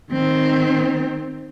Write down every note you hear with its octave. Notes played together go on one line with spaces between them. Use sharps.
D#3 C4